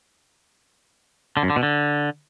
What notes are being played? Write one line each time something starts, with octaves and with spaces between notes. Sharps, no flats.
D3
F#2
D3
B2
D3